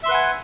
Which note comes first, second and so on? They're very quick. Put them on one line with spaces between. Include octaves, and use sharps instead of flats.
E5 C6 B4 F#5 G#5